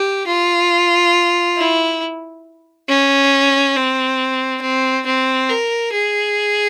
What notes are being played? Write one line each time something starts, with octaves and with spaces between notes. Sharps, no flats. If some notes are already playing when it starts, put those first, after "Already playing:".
Already playing: G4
F4
E4
C#4
C4
C4
C4
A#4
G#4